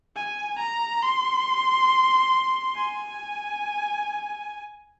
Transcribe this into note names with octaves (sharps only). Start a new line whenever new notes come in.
G#5
A#5
C6
G#5